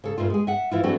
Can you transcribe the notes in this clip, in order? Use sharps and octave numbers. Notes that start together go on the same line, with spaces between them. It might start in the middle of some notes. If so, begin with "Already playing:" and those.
C#3 A4
G2 A#2 A3 F4
G#3 G#4
E5 F#5
E3 E4 F4
E3 F#3 A3 C4 D4 F#4